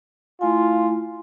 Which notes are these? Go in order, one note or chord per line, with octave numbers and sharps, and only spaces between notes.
A3 E4 F4 G#5